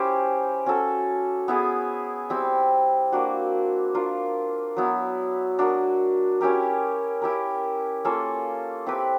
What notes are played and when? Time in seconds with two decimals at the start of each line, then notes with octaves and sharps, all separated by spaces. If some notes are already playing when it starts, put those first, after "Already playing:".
Already playing: C#4 E4 G4 C5
0.66 C#4 F#4 A4
1.48 B3 E4 G#4
2.30 G3 C4 E4
3.12 A#3 D4 F#4
3.94 D4 F4 A#4
4.77 F#3 B3 E4
5.59 D4 F#4 A#4
6.41 C#4 E4 G4 A#4
7.22 E4 G4 A#4
8.05 A#3 C#4 F4 A4
8.87 C4 E4 G4 B4